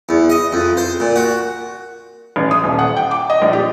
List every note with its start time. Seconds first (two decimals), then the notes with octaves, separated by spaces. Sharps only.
0.09 E2
0.30 D#5
0.53 F2
0.77 C5
1.00 A#2
1.16 F#4
2.36 A1
2.51 D#6
2.64 D#1
2.79 F#5
2.97 G5
3.11 D6
3.30 D#5
3.42 A#1
3.53 G4